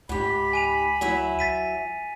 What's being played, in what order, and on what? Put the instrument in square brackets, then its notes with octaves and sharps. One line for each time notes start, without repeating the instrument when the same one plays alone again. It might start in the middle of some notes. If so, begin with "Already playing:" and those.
[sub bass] C#2 [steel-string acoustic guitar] G#2 G4 [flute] B5
[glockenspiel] G#5 D#7 F7
[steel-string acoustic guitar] F#3 E4 E5
[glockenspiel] A6 B6 D#7